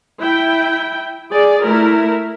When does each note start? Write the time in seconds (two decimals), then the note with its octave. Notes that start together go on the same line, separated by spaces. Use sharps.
0.21 E4 G5
1.32 G#4 D5
1.66 A3 E4 A#4